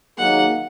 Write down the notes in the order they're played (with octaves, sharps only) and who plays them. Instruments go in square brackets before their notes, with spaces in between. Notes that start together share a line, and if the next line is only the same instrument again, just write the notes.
[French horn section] D#3 F#3 A#3 D#4 G#4 [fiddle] F#5